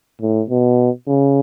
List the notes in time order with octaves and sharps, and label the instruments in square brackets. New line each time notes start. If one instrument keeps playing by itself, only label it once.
[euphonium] A2
B2
C#3